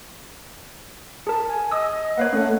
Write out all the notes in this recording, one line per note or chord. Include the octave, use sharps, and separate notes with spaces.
G#4 A#4 A5
G#5
D#5 D#6 E6
A#3 B4 C#5 F5 F#5
A3 C#4 F#5